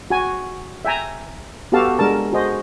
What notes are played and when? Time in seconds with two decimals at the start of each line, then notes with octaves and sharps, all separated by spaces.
0.10 F#4 G#5
0.85 E5 G5 G#5 A#5
1.72 B3 F#4 G4 A4 F5 A5
1.99 G#3 D4 A#4 A5
2.32 F#4 G#4 C5 D#5